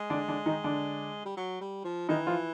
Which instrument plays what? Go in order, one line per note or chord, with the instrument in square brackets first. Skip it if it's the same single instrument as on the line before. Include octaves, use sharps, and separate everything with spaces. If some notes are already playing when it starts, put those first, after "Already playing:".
Already playing: [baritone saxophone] G#3
[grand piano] D3 D4
D3 D4
D#3 D#4
D3 D4
[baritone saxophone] G3
F#3
G3
F3
[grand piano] D#3 D#4 [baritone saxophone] E3
[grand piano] F3 F4